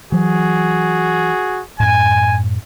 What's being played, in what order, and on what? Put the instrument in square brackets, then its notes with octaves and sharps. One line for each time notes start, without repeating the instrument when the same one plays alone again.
[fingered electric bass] E3 F#3 [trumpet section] F#4 G#4
[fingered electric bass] F#2 A2 [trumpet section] G#5